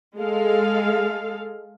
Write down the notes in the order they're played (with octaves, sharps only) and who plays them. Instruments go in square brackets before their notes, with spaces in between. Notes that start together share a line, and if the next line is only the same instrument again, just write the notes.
[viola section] G#3 A4 F5